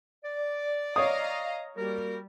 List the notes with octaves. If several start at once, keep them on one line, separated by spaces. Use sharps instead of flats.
D5
C#5 D#5 F5 A#5 D#6
G3 A#3 F#4 A#4